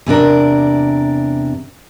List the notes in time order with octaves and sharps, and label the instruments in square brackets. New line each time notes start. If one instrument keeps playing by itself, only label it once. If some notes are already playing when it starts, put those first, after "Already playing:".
[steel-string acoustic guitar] E2 C3 D4 A#4